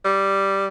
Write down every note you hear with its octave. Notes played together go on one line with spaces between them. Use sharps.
G3